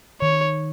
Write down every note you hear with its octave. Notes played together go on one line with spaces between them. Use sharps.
D#3 C#5